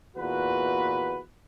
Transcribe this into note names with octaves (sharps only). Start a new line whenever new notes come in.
E2 A#2 F#4 B4